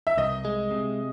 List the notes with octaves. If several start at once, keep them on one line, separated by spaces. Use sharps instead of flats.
E5
C2 D#5
G#3
C3